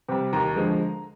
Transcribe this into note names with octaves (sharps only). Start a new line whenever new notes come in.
C3 G3
D#2 A#5
D3 F3 G#3